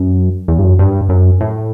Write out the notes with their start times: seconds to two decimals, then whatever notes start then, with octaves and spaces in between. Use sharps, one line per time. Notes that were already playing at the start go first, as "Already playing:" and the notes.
Already playing: F#2
0.48 E2
0.59 G2
0.63 F#2
0.79 G2
1.09 F#2
1.41 A2